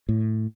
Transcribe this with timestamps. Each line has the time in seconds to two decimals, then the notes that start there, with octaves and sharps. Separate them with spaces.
0.09 A2